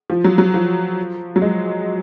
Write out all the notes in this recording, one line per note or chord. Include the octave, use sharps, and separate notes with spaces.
F3
F#3
F#3
F3
F#3
G#3